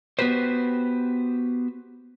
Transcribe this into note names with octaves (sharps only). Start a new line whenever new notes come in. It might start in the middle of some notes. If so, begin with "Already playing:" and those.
B3 F#4 G4 B4 C5